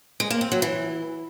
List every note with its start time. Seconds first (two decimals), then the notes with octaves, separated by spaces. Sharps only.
0.20 G#3
0.30 A#3
0.41 C4
0.52 F#3
0.62 E3